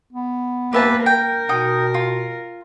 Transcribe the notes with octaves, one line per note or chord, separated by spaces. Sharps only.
B3
A#3 G4 B4 E5 A5
A#4 G5
B2 D#4 G5 D#6
F4